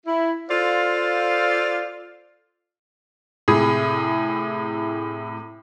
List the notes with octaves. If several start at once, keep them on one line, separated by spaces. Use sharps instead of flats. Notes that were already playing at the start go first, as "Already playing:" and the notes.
E4
F4 A4 C5 D5 F5
A2 C3 G#4